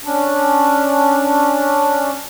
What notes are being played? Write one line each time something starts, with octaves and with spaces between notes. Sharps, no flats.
C#4 D4